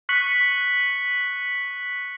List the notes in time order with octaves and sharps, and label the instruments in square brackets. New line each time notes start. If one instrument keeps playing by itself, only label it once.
[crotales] C#6 F#6 B6 C#7 F#7